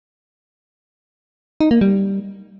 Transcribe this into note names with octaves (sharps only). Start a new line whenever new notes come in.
D#4
A#3
G3